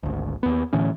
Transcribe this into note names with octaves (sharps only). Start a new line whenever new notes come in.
G#1 D2
D#2 B3
A2 D3 E3 C#4